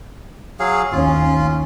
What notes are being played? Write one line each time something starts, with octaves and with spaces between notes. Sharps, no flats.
F#3 G#4 F5
D#2 C#4 F4